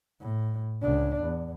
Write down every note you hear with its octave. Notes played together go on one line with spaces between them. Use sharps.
A2
C#2 D4
E2